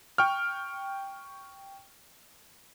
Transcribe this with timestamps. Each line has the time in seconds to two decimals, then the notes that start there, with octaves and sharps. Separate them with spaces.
0.18 G5 C#6 F6